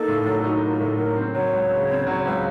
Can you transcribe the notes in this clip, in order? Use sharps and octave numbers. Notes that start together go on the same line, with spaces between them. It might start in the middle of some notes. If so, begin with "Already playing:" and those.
Already playing: A#3 D#4 A4
A2
F#3
D#4 F#4
A#3 F4
A#4
A2 A4
F#3 A#4
C4
F#3 C#5
C#2
C#3
C4
F#3
C#2 C5